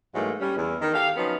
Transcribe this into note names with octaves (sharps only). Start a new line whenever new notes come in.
G#2 E3 F#3 A3 A#3
G3 C#4
E2
D#3
G4 A4 F5
F3 F#3 B3 C#4 D#4